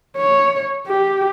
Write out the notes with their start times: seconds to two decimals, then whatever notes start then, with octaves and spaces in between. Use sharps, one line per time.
0.17 C#5
0.87 G4